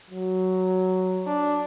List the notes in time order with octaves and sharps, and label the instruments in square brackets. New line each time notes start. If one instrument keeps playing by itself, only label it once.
[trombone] F#3
[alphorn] D4